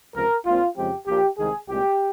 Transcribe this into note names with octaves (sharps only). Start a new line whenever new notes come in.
C#2 C3 F3 A#4
A#1 A#2 G#3 C4 F4
F2 C#3 F3 G#3 C4 G4
A#1 A#2 F3 G4
C2 C3 D#3 G#3 G#4
C2 A#2 G#3 C4 G4